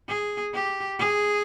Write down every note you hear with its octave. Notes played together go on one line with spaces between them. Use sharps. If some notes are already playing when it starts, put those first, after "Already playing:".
G#4
G4
G#4